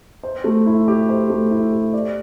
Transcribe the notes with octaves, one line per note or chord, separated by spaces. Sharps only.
C5
A3
E4
G4
C5
A3
E4
G4
D5